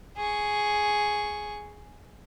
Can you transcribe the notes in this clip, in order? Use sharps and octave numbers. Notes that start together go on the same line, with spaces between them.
G#4 C#6